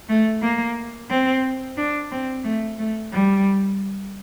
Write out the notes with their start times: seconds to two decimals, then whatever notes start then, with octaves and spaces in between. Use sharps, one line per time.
0.09 A3
0.42 A#3
1.10 C4
1.77 D4
2.11 C4
2.44 A3
2.79 A3
3.13 G3